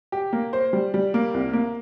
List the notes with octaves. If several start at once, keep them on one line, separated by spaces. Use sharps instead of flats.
G4
A#3
C5
G3
G3
A#3
C2
A#3